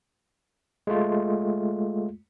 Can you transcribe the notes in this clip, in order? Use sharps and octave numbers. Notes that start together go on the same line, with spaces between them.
G#3 A3 F4